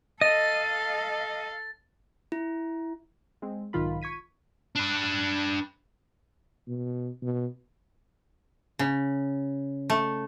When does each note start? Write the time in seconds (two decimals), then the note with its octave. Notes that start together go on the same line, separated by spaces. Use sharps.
0.21 A4 D#5 F5 A6
2.32 E4
3.42 G#3 C4
3.73 B1 G#2 D#3 F4 B5
4.02 C#6 G#6 B6 D#7
4.76 D4 B4
6.68 B2
7.22 B2
8.79 C#3
9.90 A3